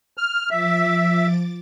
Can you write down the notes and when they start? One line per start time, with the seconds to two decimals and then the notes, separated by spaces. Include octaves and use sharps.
0.17 F6
0.51 F3 E5 D6 A6